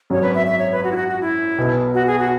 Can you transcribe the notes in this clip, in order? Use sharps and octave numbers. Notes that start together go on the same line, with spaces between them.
G#1 F#2 F#3 C#4 C#5
B4
E5
E5
C#5
B4
F#4
E4
F#4
F#4
E4
B1 B2 B3
F#4
G#4
F#4